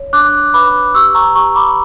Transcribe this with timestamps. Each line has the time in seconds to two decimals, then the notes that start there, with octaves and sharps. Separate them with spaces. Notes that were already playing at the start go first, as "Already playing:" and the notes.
Already playing: C#5
0.13 D4 D6 F#6
0.54 B4 B5 D6
0.94 G4 C#6 E6
1.15 A#5 C#6
1.35 G4 A#5 C#6
1.55 B5 D6